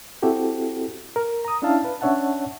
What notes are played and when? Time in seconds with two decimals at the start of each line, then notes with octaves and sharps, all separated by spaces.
0.22 C4 E4 F#4 G4 A4
1.16 A#4
1.45 A#5 D#6
1.62 C#4 D4 E4 E5 F5 A5
1.85 B4
2.01 C#4 D4 C#5 E5 F#5 A5